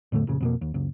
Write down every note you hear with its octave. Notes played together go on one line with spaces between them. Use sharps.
E2 A2 D3 A3
F1 A#2 C#3
F2 B2 A#3
D#2
F#1 C#2